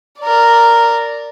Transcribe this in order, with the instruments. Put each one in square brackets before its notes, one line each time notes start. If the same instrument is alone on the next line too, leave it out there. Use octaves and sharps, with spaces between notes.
[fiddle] A#4 D5